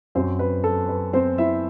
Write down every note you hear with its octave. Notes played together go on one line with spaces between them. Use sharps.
F#2 F#3 C4 C5
B4
A4
B4
C4 C5
E4 E5